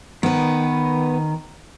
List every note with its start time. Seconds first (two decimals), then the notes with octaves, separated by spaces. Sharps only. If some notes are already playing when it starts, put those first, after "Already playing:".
0.23 D#3 B3 B4